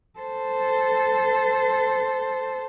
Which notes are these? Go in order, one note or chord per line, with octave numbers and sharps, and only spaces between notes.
A4 C5